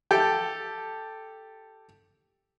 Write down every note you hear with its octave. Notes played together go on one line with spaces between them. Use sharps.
G4 A4